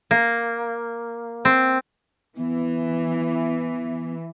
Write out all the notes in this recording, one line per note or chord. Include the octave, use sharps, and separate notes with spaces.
A#3
C4
E3 B3